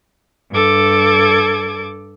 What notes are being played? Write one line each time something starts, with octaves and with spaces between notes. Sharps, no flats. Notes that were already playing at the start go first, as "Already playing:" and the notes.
G2 A4 D6 G#6